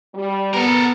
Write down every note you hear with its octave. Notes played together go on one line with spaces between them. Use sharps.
G3
B3 A4 A#4